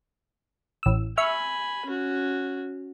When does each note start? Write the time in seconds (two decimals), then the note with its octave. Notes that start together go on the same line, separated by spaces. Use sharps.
0.83 A1 E6
1.17 E5 G#5 B5 C#6 F6
1.86 C#4 F#4